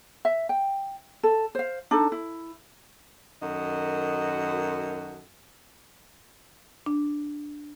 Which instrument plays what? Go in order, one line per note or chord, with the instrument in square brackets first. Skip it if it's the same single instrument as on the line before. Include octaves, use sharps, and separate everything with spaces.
[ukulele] E5
G5
A4
C5 F5
D4 D#4 A4
E4
[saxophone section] F#2 D#3 F#4 A4 D#5
[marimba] D4